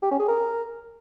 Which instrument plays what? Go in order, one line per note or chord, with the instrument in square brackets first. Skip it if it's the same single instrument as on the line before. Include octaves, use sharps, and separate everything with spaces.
[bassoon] G4
C#4
G#4
A#4